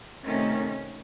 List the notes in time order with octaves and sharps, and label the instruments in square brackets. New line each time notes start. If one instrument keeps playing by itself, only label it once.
[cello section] C3 D#3 A3 C#4